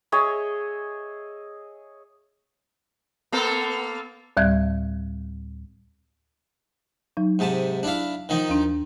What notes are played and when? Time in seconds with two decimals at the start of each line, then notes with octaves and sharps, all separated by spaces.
0.12 G#4 C#5 D#5 E5
3.32 A#3 B3 A4
4.37 D2 A2 G3 E5 F#6 G#6
7.17 F#3 D#4
7.39 G#2 C3 A5
7.83 D4 E4 F5
8.29 D#3 F3 D#4
8.49 D#2 D4